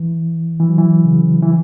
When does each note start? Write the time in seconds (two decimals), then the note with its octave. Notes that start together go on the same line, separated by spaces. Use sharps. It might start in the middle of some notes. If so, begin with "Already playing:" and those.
Already playing: E3
0.60 E3
0.69 F#3
0.78 E3
1.05 C#3
1.42 E3